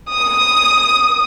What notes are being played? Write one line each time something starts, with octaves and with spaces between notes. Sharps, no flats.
D#6